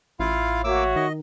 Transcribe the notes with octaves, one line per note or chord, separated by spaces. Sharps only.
A1 E4 F4 F5
A#3 F#4 C#5 E5 D6 E6
D#3 D#5